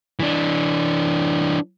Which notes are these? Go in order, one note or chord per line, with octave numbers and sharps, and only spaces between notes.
E3 D4